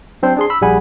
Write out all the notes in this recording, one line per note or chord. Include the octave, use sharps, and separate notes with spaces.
F#3 C4 D4 C5
D4 G#4 C6
B5 E6
A#1 G3 G#4 F#5 G#5 B5